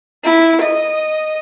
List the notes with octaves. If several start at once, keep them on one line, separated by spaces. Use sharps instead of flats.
E4
D#5